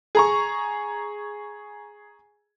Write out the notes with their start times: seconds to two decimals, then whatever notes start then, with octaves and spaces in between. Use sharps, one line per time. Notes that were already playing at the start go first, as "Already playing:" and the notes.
0.15 G#4 A#5 C#6